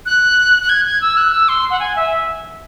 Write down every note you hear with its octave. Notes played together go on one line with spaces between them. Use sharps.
F#6
F#6
G#6
G#6
E6
F#6
E6
C6
F#5
G#5
E5